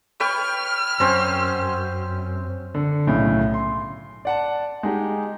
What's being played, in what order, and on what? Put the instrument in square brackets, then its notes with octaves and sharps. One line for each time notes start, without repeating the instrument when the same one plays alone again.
[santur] B4 C#5 G5 [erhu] F6
[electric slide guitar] F#2 [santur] C4 C#4 C5
[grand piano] D3
B1 A2 C#3
C6
D5 F#5 A5
G#3 D#4 G4